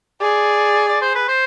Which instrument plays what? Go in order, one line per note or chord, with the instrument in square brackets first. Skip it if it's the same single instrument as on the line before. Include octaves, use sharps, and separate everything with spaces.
[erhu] G#4 [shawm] D5
[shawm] D5
C5
B4
C5